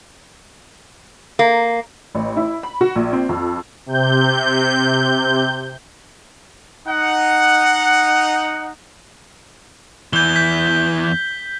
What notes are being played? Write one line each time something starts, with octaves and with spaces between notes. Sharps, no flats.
A#3
A1
E4
B5
F#4
A#1
C4
F2
C3 G6
D#4 F#5
E2 E3 G6 G7
G6 B6